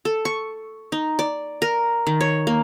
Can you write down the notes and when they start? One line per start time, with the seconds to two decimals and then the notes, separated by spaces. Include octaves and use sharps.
0.05 A4
0.25 C#6
0.92 D#4
1.19 D5
1.62 A#4
2.07 D#3
2.21 C#5
2.47 A#3